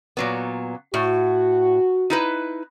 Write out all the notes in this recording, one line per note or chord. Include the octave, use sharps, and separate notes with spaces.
A#2 F#3 B3
A2 F#4
D#4 E4 B4